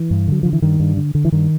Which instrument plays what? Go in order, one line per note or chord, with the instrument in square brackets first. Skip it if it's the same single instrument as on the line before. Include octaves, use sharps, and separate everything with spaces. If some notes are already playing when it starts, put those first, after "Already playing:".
Already playing: [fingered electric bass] E3
G2
D3 F#3
D3 F3
E3
G2 D#3
G2
D3
D3
E3
G2 D#3